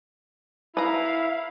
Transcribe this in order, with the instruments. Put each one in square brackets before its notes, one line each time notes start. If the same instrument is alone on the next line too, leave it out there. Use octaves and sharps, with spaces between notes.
[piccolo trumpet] E4 [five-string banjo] B4 A#5 [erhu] F5